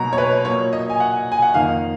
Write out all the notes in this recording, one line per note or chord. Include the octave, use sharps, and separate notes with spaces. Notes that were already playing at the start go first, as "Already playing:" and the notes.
Already playing: B2 F#3 A#3 A#5
C#5
B4
A#2 F#3 A#3 C#5
D#5
G#5
F#5
G#5
F#5
F2 D#3 A#3 F5